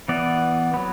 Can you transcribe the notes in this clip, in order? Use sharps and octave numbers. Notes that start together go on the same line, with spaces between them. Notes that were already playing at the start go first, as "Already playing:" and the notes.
E3 B3 D5
F#3 B3